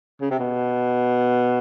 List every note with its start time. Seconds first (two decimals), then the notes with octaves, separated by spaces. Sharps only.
0.21 C#3
0.31 C3
0.39 B2